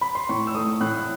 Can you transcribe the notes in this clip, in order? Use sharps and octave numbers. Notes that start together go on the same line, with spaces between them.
B5
C6
A2 C#6
E6
A3 D#6
A2 F#6